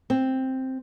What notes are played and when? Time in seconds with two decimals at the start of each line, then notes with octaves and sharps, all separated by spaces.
0.10 C4